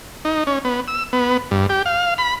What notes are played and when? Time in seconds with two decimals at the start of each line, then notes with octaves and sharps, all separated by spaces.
0.25 D#4
0.47 C#4
0.65 B3
0.88 E6
1.13 B3
1.51 G2
1.69 G4
1.86 F5
2.18 B5